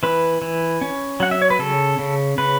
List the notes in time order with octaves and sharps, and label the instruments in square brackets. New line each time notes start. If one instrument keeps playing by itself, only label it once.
[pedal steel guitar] E3 B4
E3
C#4
F#3 F#5
E5
C#5
B4
C#3 A4
C#3
C#3 B4